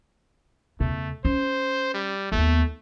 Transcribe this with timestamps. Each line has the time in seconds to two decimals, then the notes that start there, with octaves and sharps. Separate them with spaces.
0.80 E2 C#3 A3
1.25 C#4 C5
1.94 G3
2.32 D#2 A3 B3